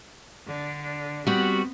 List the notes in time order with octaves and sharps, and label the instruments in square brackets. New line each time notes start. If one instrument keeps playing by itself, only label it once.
[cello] D3 D4
[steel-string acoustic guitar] G3 F#4 [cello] B3 C4